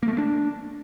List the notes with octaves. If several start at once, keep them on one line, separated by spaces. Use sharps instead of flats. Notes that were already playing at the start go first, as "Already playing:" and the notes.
A#3
A3
A#3
D4